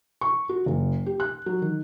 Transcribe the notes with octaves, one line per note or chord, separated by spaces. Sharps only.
C#6
F#4
F#1
G4
F#6
F#3
D#3